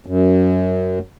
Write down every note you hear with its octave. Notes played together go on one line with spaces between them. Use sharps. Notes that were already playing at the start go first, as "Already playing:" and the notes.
F#2